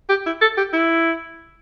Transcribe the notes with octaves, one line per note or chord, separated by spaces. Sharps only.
G4
E4
A4
G4
E4